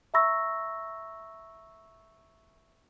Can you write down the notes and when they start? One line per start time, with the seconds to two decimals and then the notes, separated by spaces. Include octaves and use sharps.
0.14 E5 A#5 B5 C#6 E6 A#6